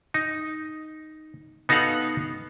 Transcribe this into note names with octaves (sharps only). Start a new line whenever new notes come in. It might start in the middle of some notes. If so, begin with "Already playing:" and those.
D#4
B3 D#4 F#4 A4 F5 F#5